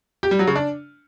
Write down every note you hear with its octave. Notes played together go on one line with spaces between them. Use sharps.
G4
G3
F#3
C#3
D4